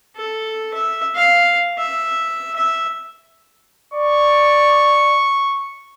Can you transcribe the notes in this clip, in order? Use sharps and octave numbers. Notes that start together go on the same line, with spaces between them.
A4
E5
F5
E5
E5
D5 C#6